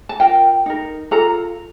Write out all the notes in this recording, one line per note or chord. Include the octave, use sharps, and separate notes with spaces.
A5
F4 A#4 G5
D#4 A#4
F4 A4 A#5